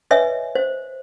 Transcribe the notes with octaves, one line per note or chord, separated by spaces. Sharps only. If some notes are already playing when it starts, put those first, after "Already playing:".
B4 C#5 D#5 E5 G#5
C5